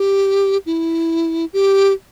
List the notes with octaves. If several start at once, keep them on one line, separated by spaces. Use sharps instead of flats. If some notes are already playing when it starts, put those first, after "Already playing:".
Already playing: G4
E4
G4